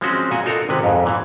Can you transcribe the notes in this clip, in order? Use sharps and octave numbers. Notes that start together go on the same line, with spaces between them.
F3 G#3 C4 C#4 F#4 C5
A#2 F#4 G#5
D#4 F4 F#4 A4 A#4 A#5
G#1 C3 G#3 B4
F2 G#2
A#2 E3